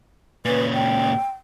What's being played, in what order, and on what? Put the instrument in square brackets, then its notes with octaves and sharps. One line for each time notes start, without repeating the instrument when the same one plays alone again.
[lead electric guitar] A#2 C#3 [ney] B4
[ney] G5